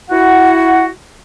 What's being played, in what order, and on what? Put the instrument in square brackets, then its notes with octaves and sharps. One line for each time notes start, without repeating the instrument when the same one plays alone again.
[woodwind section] E4 F#4 F#5